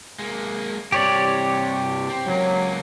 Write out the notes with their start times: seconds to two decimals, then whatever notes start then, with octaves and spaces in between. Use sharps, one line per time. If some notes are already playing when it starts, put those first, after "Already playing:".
0.19 G#3 A#3
0.92 G2 C3 G4 C#5 D5
2.09 C4
2.26 C#2 F#3 A#3